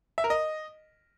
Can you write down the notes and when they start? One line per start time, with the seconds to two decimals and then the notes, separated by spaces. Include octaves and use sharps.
0.18 E5
0.24 A#4
0.30 D#5